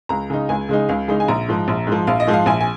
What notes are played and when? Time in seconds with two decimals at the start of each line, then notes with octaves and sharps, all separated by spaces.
0.09 C#2 A#5
0.30 C#3 G#3 D#4
0.49 C#2 G#5
0.69 C#3 G#3 D#4
0.89 C#2 F5
1.08 C#3 G#3 D#4
1.20 G#5
1.28 A#1 A#5
1.48 G#2 F3
1.68 A#1
1.87 G#2
1.92 F3
2.07 A#1 F5
2.20 D#5
2.27 G#2 F3
2.33 F5
2.46 A#1 G#5
2.61 G#5